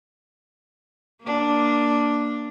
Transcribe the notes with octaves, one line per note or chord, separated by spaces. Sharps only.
A#3 D4